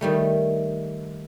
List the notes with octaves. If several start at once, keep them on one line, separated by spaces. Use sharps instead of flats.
D#3 G3 A3